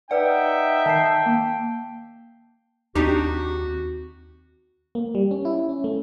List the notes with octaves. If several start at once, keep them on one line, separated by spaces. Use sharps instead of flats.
D#4 B4 D5 E5 F#5 G5
D#3 A5 G6 C7
A#3
D#2 C4 D4 D#4 F#4 G4
A#3
G3
C#4
E4
C#4
A3